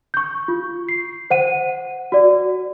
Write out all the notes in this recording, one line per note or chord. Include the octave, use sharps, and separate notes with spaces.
C#6 G6
F4
C7
C5 F#5 D#7
F#4 D5